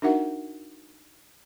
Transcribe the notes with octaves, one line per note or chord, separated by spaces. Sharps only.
D4 D#4 F#4 A#4 E5 F#5